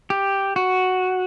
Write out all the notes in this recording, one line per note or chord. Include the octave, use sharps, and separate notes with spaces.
G4
F#4